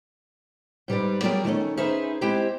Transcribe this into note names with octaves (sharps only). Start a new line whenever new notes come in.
G#2 G3 B4 D5
F#3 G3 F4 G#4 A#4 D5
D#3 A3 C4 C#4
C#4 D#4 G#4 B4 C5 E5
G#3 C4 E4 G4 C5